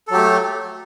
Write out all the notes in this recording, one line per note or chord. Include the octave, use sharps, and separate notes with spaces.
F#3 A3 G4 A4